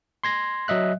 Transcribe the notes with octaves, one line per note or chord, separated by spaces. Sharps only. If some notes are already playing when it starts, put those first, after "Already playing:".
C6 G#6 A#6
F#3 D#5 E5 F#6